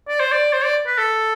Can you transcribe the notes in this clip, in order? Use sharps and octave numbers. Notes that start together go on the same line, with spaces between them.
D5
C5
D5
C5
D5
B4
A4